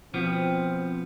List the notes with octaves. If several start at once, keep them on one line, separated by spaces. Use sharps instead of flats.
B2 F3 B3 C4